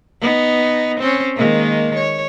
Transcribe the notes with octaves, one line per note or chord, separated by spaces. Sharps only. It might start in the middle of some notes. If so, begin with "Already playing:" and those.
B3 D#4
C4 C#4
D#3 G#3 A#3
C#5